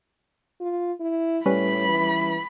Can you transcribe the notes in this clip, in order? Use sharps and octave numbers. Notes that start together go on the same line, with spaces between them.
F4
E4
A2 G3 C#4 B4 B5
E3